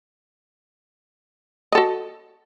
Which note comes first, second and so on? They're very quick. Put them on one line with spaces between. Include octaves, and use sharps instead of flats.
D#5 A4 F#4